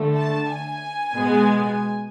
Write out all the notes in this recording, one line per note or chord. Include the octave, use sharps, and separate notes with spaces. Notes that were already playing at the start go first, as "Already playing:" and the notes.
Already playing: D3 A3
A5
G#5
B2 G#3 B3